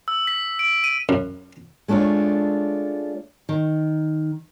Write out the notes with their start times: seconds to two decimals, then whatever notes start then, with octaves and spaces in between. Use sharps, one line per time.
0.08 E6
0.27 B6
0.59 D7
0.84 D#7
1.09 F#2
1.88 G#3 A3 D4 F4 C#5
3.49 D#3